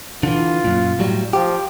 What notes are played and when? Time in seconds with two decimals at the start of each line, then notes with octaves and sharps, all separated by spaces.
0.23 D3 E3 F4
0.64 F#2 A#2
0.99 A2 F#3 G3
1.33 F3 G4